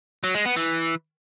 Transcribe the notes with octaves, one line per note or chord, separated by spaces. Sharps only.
F#3
G#3
B3
E3